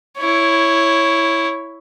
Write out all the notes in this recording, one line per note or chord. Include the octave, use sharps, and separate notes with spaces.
E4 C#5